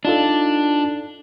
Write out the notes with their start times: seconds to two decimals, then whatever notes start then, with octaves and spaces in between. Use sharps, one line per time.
0.05 D4 D#4 F4 A4